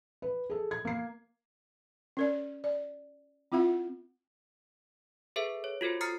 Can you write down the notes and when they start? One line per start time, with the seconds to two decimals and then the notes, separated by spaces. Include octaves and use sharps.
0.22 B4
0.50 G#4 A4
0.71 G#6
0.85 A#3 C7
2.17 C#4 A#4 D5
2.64 D5
3.52 C4 E4 F4 E5 F#5
5.36 G#4 A4 B4 E5
5.64 C#5
5.81 F4 F#4 A4 C5
6.01 A#5 D#6 F6 A6 C7 C#7